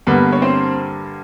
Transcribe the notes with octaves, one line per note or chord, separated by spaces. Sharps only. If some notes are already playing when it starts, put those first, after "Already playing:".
G2 D3 G3 A#3 B3 B4
C#5
C4 C5